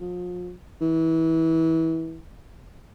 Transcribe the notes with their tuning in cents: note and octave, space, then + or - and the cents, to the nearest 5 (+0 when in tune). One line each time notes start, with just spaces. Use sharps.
F3 +35
E3 -25